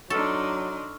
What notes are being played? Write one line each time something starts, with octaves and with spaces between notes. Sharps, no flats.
F#3 D4 D#4 A4 C6 C#6 E6 F6